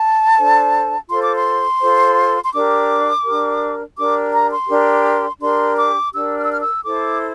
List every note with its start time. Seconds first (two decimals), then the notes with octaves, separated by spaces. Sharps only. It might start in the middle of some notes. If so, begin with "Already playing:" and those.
Already playing: A5
0.38 D4 A4 C5
1.09 F4 A4 C5 C6
1.22 D6
1.35 C6
1.81 F4 A4 C5
2.44 C6
2.53 D4 G4 A#4 D6
3.24 D4 G4 A#4
3.96 D4 G4 A#4 D6
4.32 A#5
4.51 C6
4.69 D4 G4 A#4
5.40 D4 G4 A#4 C6
5.76 D6
6.12 D4 G4 A#4 E6
6.37 F6
6.44 E6
6.51 F6
6.60 E6
6.84 E4 A4 C5 D6